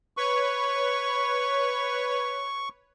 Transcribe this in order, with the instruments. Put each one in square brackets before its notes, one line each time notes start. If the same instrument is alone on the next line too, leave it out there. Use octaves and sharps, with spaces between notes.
[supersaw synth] B4 C#5 [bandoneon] C#6